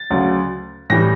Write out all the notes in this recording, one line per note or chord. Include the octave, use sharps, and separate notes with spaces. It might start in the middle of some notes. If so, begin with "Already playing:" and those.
Already playing: A6
D2 C#3 F#3
A2 E3 G3 A#6